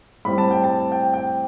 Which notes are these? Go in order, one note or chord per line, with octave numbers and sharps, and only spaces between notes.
A2 G3 C4 B5
A5
G5
A5
G5
G5